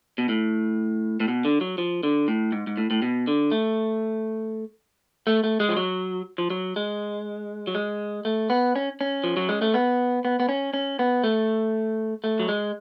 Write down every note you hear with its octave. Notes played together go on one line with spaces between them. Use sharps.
B2
A2
A2
B2
D3
F#3
F3
D3
A2
G#2
G#2
A2
A2
B2
D3
A3
A3
A3
G#3
F3
F#3
F3
F#3
G#3
F#3
G#3
A3
B3
C#4
C#4
F3
F#3
G#3
A3
B3
B3
B3
C#4
C#4
B3
A3
A3
F#3
G#3